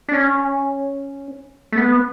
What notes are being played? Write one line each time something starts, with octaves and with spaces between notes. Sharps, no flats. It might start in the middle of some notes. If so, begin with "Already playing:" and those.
D4
C#4
A3
B3